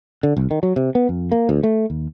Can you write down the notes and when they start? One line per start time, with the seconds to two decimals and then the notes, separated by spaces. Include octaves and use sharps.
0.23 D3
0.37 C2
0.51 D#3
0.63 F#3
0.76 C3
0.95 B3
1.09 F2
1.32 A#3
1.49 D2
1.63 A3
1.90 D#2